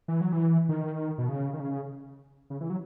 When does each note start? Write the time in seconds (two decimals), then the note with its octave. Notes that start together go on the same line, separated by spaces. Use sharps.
0.08 E3
0.21 F#3
0.32 E3
0.69 D#3
1.18 B2
1.29 C#3
1.53 D#3
1.60 C#3
2.50 C#3
2.61 E3
2.70 F#3